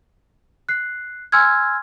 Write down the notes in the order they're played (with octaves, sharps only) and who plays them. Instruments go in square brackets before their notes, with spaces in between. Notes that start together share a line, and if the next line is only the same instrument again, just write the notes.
[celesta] F#6 C7
G#5 C6 E6 F6 G#6